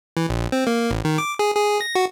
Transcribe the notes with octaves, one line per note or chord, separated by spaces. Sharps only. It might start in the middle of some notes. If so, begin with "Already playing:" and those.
E3
A#1
C4
A#3
A1
D#3
D6
G#4
G#4
A#6
F#4